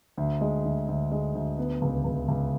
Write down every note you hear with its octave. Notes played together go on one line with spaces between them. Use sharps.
D2
G#3
D2
D2
G#3
D2
B3
C#2
C#2
C#2